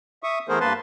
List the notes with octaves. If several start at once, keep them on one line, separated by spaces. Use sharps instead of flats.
E5 C#6 D#6
E3 A3 B3 G#4 A#4 C5
G2 A#3 B4 A5 C6